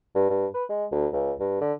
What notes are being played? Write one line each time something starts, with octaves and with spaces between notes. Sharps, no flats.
G2
G2
B4
G#3
D2
C#2
G2
D3